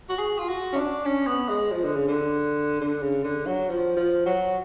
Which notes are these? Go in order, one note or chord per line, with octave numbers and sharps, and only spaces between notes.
F#4
G#4
F4
F#4
C#4
D4
C#4
B3
G#3
F3
D3
C#3
D3
D3
C#3
D3
F#3
F3
F3
F#3